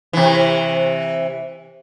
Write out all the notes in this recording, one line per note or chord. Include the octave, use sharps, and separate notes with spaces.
C3 E3